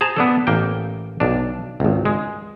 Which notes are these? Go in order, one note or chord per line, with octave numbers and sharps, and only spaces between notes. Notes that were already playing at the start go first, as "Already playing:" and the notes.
G#4 C5 A5 A#5
B3 D4 A4
A1 A#3 G5
B1 D4
G#1 C#2
G#3